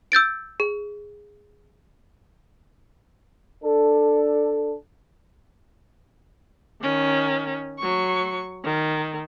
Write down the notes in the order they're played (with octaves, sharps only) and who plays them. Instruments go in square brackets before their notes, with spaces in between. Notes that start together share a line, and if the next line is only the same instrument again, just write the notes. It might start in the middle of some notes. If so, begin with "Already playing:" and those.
[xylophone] E6 G6 A6 D7
G#4
[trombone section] D4 A4
[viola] D#3 C#4
F#3 C#6
D#3